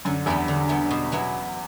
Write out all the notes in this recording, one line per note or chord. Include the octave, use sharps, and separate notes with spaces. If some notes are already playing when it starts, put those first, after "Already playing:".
F#2 D3
E2 G3 B3 E4
D3
G3 B3 E4
B2
F#3 B3 E4